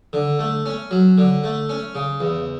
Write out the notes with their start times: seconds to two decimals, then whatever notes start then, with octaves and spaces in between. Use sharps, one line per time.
0.13 D3
0.39 A3
0.66 C#4
0.91 F#3
1.18 D3
1.44 A3
1.69 C#4
1.95 C#3
2.20 E2